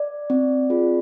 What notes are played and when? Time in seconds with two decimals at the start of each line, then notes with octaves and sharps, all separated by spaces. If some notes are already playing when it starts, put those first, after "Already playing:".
Already playing: D5
0.30 C4
0.70 F4 G#4